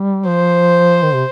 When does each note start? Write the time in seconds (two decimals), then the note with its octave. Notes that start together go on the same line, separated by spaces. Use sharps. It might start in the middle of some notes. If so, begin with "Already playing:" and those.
Already playing: G3
0.27 F3 C5
1.03 D#3
1.14 C3